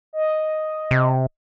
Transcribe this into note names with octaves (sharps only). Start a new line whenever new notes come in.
D#5
C3